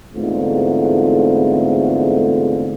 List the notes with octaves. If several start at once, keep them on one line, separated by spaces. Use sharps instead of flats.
E2 G#2 D3 A3 C4 F4